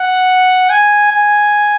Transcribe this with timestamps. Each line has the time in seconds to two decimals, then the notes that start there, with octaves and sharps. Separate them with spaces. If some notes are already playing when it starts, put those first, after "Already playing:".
Already playing: F#5
0.70 G#5
1.12 G#5